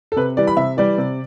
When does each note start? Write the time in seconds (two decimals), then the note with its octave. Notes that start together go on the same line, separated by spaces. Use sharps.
0.12 A4
0.16 C3 B4
0.37 E3 G3 D5
0.47 B5
0.57 C3 E5
0.77 E3 G3 D5
0.98 C3